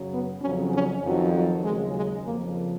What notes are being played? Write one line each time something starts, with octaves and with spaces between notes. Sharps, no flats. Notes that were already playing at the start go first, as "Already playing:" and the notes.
Already playing: F#2 C#3 F#3
B3
F2 C#3 F#3 C#4
C#4
F2 D#3 F#3
F#3
D#2 C#3 F#3 G#3
G#3
F2 C#3 F3 A#3